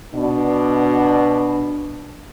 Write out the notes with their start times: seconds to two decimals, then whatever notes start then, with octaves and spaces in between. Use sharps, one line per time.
0.15 B2 D4